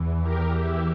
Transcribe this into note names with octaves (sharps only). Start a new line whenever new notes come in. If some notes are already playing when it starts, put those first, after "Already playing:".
Already playing: E2 E3
G4 A#4
E4 G4